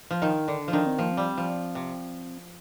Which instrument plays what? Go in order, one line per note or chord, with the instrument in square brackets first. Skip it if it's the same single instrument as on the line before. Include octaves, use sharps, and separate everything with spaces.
[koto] F3
[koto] D#3 [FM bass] D#4
[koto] D3 [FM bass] D4
[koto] F3
[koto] D#3 [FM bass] D4
[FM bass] C4
[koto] F3 [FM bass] A#3
[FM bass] C4
[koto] G3
F3
C3